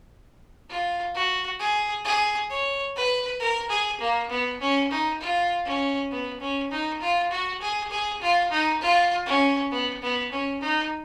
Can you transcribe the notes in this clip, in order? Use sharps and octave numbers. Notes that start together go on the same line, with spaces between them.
F4
F#4
G#4
G#4
C#5
B4
A#4
G#4
A#3
B3
C#4
D#4
F4
C#4
B3
C#4
D#4
F4
F#4
G#4
G#4
F4
D#4
F4
C#4
B3
B3
C#4
D#4